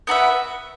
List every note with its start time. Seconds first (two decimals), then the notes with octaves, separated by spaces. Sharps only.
0.07 B3 F#4 B4 E5